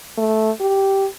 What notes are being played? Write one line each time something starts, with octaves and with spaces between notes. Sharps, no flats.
A3
G4